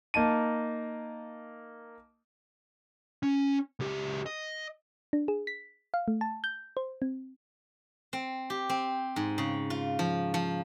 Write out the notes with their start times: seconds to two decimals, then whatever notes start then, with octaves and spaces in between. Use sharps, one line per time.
0.14 A#3 D#4 A5 D#7
3.23 C#4
3.80 C#2 G4
4.26 D#5
5.13 D4
5.28 G#4
5.47 B6
5.94 F5
6.08 A3
6.21 A5
6.44 G6
6.77 C5
7.02 C4
8.13 C4
8.50 G4
8.69 C4
9.16 G#2
9.38 C#3
9.70 F4
9.99 F3
10.34 F3